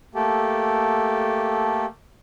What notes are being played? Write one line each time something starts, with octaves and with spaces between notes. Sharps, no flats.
A3 A#3 G4 A4